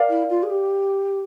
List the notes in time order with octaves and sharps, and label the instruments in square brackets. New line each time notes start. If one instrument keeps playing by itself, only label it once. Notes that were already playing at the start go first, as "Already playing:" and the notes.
Already playing: [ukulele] A#4 D5 F5
[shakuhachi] E4
F4
G#4
G4